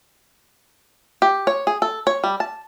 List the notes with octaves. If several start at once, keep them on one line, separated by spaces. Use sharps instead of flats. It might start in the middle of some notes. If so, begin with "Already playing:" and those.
G4
C#5
G#4
A4
C#5
G3
A5